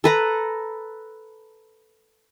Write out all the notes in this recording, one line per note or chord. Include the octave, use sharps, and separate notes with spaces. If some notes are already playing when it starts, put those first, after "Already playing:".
A4 B4 A#5